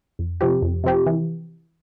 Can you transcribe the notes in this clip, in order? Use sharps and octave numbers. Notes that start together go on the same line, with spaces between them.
F2
C3 F3 C4 G4
F2
C3 F3 C4 G4
E3